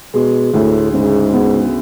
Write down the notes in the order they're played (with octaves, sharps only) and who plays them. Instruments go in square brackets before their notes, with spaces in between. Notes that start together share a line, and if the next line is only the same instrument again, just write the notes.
[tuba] B2 [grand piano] G#3
[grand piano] D2 [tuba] A2
[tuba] G#2 [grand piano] C#3
[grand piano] B3